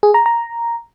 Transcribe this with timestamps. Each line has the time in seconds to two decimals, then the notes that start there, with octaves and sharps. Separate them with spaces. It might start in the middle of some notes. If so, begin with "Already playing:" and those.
0.03 G#4
0.14 A#5
0.26 A#5